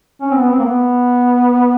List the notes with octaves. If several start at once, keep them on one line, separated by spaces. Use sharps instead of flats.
C#4
C4
B3
C4
A#3
B3